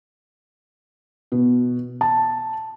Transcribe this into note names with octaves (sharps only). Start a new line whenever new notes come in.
B2
A5